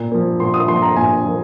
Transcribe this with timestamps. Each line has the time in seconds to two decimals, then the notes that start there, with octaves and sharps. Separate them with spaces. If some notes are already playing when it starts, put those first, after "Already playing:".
Already playing: A#2
0.12 F3 A#3
0.40 A#2 C6
0.54 D#6
0.68 F3 A#3 C6
0.82 A#5
0.96 A#2 G#5
1.25 F3 A#3